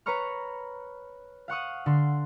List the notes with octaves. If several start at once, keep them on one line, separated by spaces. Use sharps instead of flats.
B4 C#5 A#5 C#6 F6
F5 F#5 C#6 D#6
D3 C6